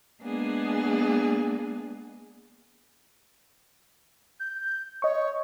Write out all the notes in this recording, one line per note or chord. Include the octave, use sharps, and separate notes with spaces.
G#3 A#3 B3 D4 G#4
G6
C#5 D#5 C#6